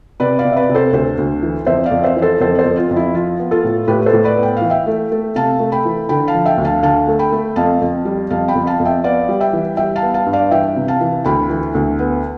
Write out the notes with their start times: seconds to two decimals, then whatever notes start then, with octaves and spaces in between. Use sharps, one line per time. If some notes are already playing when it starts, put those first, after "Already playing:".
0.20 C3 B4 D5
0.39 D5 F5
0.45 C3
0.52 E5
0.56 B4 D5
0.69 C3
0.74 A4 C5
0.93 D2 A4 C5
1.18 D2
1.42 E3
1.67 F2 C5 E5
1.86 D5 F5
1.91 F2
2.03 C5 E5
2.16 E3
2.22 A4 C5
2.40 F2 A4 C5
2.59 A4 C5
2.65 F2
2.77 F4
2.91 F2
2.96 E4
3.14 F3 F4
3.39 B3
3.51 F4 A4
3.64 A2
3.88 A2 G4 B4
4.02 B4
4.06 A4 C5
4.13 A2
4.24 B4 D5
4.37 B3
4.43 G5
4.57 E3 F5
4.70 E5 G5
4.87 A3
5.12 A3
5.36 C3 F5 A5
5.60 A3
5.72 G5 B5
5.85 E3
6.09 D3 G5 B5
6.28 F5 A5
6.34 F3
6.45 E5 G5
6.58 D2
6.65 F5 A5
6.83 D3 F5 A5
7.08 A3
7.19 G5 B5
7.32 A3
7.56 F2 F5 A5
7.81 F2
8.05 G3
8.30 F2 F5 A5
8.48 G5 B5
8.55 F2
8.67 F5 A5
8.80 F2
8.85 E5 G5
9.04 B3 D5 F5
9.29 G3
9.40 E5 G5
9.53 E3
9.77 G3 E5 G5
9.96 F5 A5
10.02 B3
10.14 F5 A5
10.26 G2
10.33 D5 F5
10.51 E3 E5 G5
10.76 C3
10.88 F5 A5
11.00 E3
11.25 D2 G5 B5
11.49 E3
11.75 D2
11.99 B3